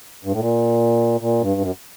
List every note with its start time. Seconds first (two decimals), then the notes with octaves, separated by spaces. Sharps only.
0.25 G2
0.33 A2
0.39 A#2
1.21 A#2
1.42 G2
1.61 F#2